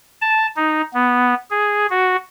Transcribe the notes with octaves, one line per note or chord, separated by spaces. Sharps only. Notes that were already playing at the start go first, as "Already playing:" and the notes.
A5
D#4
B3
G#4
F#4